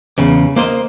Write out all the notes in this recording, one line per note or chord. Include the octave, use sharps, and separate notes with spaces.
E2 C#3
A#3 C5 D#5